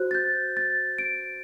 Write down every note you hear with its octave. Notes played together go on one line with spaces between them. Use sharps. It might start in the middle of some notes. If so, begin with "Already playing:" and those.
Already playing: F#4 C5 F#6
A6
G6
A6
D7